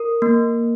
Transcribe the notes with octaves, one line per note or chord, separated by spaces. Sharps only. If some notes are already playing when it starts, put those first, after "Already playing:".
Already playing: A#4
A#3